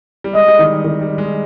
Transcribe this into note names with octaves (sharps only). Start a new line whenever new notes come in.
G3
G#3 D#5
G3
D#3
D#3
G3
G#3